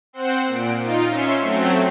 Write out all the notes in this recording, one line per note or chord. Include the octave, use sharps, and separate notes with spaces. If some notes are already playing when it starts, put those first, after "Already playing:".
C4 C5 F#5
A#2 D7
D#4 F4
C#4 E5 C6 C#7
F#3 A3 C4